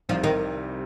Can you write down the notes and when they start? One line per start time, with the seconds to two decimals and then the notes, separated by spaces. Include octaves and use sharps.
0.09 C2 C3 F3 G3 D#4
0.24 D#3